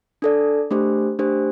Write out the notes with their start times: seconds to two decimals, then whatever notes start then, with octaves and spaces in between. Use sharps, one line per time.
0.22 D4 A4 D5
0.71 A3 D4 G4 C5
1.19 A3 D4 G4 C5